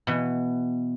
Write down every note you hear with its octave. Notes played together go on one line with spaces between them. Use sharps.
B2 E3